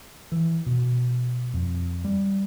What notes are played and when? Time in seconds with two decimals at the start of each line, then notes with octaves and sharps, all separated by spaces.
0.32 E3
0.66 B2
1.54 F2
2.05 G3